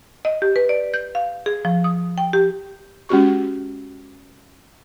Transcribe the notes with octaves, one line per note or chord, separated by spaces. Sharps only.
D#5
G4
B4
D5
G6
F5
G#4
F3
D#6
G5
G4
G#3 C#4 F#4 G4 C#6